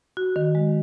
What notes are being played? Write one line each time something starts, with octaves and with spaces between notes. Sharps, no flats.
F#4
D#3
G#3